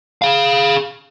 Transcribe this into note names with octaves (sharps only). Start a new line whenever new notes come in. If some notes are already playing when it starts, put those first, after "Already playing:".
G#4 F5